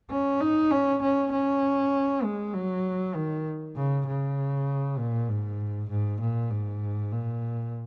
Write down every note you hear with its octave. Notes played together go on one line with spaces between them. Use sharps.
C#4
D#4
C#4
C#4
C#4
G#3
F#3
D#3
C#3
C#3
A#2
G#2
G#2
A#2
G#2
A#2